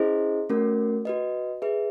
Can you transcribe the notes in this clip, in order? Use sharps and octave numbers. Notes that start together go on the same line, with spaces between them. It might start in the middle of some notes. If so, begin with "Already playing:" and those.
Already playing: C#4 E4 G#4 C5 D#5
A3 C#4 F#4 A#4
F#4 B4 D#5
G#4 B4 E5